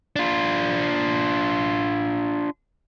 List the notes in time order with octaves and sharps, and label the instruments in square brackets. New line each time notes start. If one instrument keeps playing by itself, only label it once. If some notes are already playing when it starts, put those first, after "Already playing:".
[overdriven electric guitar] D4 F4